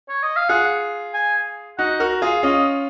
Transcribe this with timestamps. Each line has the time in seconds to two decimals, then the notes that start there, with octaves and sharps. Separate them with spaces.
0.09 C#5
0.23 D#5
0.36 F5
0.49 F4 G#4 F#5
1.14 G#5
1.78 D#4 F#4 F#5
2.00 F#4 A#4
2.22 F4 G#4
2.43 C#4 F4 D#5